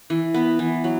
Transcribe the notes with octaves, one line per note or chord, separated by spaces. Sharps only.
E3
B3
E3
F#3